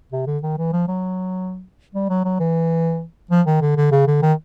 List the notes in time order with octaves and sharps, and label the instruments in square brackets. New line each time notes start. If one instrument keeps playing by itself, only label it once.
[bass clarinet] C3
D3
D#3
E3
F3
F#3
G3
F#3
F#3
E3
F3
D#3
D3
D3
C#3
D3
D#3